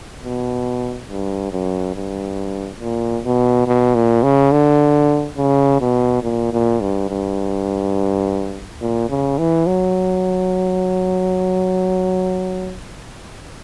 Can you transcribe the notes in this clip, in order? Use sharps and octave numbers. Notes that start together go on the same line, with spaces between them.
B2
G2
F#2
G2
A#2
B2
B2
A#2
C#3
D3
C#3
B2
A#2
A#2
G2
G2
A#2
C#3
E3
F#3